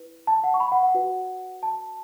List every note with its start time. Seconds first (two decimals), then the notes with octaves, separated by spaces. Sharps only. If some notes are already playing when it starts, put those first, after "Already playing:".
Already playing: E4 B4
0.27 A5
0.44 F#5
0.54 C#6
0.60 B5
0.72 F#5
0.83 F#5
0.94 F#4 B4
1.63 A5